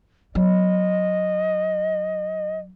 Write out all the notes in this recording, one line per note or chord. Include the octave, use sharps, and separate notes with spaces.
F#3 D#5